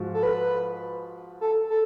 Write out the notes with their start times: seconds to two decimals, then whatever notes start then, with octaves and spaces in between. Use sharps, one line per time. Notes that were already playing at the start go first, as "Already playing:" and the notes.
Already playing: G#2 F3 F#4
0.14 A4
0.23 B4
1.41 A4
1.70 A4